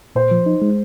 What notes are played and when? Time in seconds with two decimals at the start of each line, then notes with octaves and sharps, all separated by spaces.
0.16 A#2 C5
0.31 F3
0.46 D#4
0.62 G#3